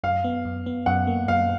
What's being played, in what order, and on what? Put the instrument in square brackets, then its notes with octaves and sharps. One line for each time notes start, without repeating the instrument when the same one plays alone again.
[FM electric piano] F#2 [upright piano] F5
[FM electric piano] B3
F#2
B3
[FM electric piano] F#2 [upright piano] F#5
[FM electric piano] A#3
[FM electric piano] F#2 [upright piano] F5